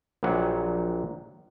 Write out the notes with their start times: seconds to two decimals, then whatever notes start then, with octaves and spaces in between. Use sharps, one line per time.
0.23 A#1 A#2 F#3 F#5